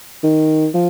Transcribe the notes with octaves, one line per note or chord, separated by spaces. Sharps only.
D#3
F3